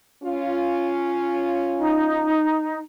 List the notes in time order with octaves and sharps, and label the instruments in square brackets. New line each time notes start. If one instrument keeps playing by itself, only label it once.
[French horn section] C#4 F4
[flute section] D#4